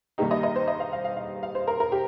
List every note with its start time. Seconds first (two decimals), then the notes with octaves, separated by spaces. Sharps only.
0.18 G2 D#3 G3 A#3 D#4 G4
0.31 D#5
0.43 D#5
0.56 C5
0.68 D#5
0.80 F5
0.93 F5
1.04 F5
1.17 F5
1.43 F5
1.55 C5
1.67 A#4
1.80 A#4
1.92 G4